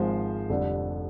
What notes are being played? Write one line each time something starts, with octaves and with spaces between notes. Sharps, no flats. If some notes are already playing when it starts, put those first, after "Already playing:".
Already playing: G#1 G#2 F3 G#3 C5
F1 F2 D3 G3